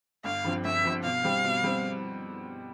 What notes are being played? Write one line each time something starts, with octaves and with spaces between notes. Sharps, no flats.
G1 F5
G2 F3 C4
G1 E5
G2 F3 C4
B2 F5
G3 C4
B2
G3 C4